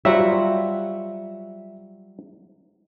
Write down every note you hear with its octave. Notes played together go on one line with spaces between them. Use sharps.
F#3 G3 F4 C5 E5 F#5 A#5